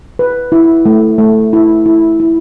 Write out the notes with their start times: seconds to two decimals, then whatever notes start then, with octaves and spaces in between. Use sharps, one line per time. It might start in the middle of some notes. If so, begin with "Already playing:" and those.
0.19 B4
0.52 E4
0.86 A3
1.18 A3
1.53 E4
1.86 E4
2.20 E4